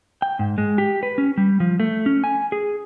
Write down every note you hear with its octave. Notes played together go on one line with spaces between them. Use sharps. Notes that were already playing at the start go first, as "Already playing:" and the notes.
G5
G#2
G#3
G4
B4
C#4
G3
F3
A3
C#4
G#5
G#4